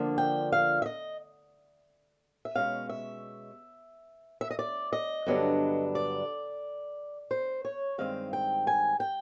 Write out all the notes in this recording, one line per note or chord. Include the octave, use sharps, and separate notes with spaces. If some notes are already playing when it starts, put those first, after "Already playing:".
Already playing: D3 F3 A#3 D4
G5
F5
E5
D#5
E5
B2 G#3 C#4 F5
E5
E5
D#5
D5
D#5
G2 D3 F#3 B3 D4
D5
C5
C#5
G2 D#3 G#3 C4 F5
G5
G#5
G5